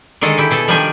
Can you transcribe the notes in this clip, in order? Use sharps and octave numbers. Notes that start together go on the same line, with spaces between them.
D3 D#3 G#3 A4 D#5 A5
E4 G4
B2 G#4 A4
D#3 F3 G3 D4 G4 G#5